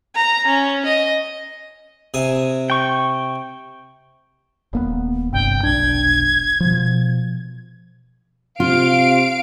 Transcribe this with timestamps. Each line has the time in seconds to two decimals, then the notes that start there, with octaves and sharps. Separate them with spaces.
0.15 A#5
0.46 C#4
0.85 D#5
2.14 C3 G#5 D#6
2.70 G5 C#6
4.73 D#1 A#3 B3
5.33 G1 G2 C3 G5
5.63 F1 B1 D4 G#6
6.60 B2 F3
8.60 C3 F4 F5 D7